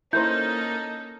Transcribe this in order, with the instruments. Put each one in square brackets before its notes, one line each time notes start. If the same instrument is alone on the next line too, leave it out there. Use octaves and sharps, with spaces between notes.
[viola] A#3 C#4 [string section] D#4 A4 [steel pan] E4 A#4 C5 [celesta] G6